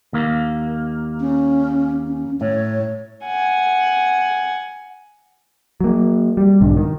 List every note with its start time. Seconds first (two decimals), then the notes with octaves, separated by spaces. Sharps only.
0.13 D#2 A#3
1.20 C#4
2.07 C#4
2.41 A2 C#5
3.25 F#5 G#5
5.81 F#3 A#3
6.37 G3
6.61 B1 G#2 D3
6.77 D#3